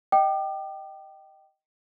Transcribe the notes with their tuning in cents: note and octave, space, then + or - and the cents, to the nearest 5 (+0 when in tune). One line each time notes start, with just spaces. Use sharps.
D#5 +0 G5 -15 D6 +40